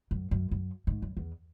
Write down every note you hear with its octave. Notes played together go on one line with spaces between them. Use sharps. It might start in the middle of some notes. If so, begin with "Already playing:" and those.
F#2
F#2
F#2
G#2
F#2
E2